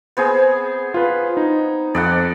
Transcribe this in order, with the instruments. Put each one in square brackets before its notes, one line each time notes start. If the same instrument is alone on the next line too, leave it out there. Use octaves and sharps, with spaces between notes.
[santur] B3 C4 G#4
[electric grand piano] F4 B4
D#4
[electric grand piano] F2 [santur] D5 D#5 F#5